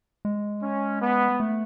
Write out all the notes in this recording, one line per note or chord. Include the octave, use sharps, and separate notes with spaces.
G#3
C#4
B3
A3